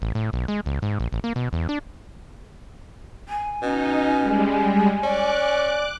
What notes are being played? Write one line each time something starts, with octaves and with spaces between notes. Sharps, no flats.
A1
A2
B1
G#3
C#2
G#2
A#1
A1
A#3
B2
E2
D4
G#5
B2 C#4 D#4
G3 G#3
C#4 D5 D6 F#6